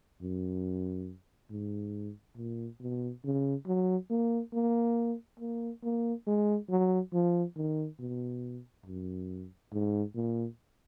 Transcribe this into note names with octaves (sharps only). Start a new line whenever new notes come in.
F#2
G#2
A#2
B2
C#3
F#3
A#3
A#3
A#3
A#3
G#3
F#3
F3
D#3
B2
F#2
G#2
A#2